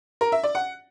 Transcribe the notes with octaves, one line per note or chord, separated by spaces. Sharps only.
A#4
E5
D5
F#5